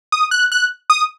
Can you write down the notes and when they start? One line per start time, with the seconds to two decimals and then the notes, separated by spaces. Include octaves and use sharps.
0.12 D#6
0.31 F#6
0.52 F#6
0.90 D#6